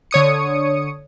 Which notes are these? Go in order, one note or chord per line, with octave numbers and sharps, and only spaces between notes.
D3 C#5 D#6 C#7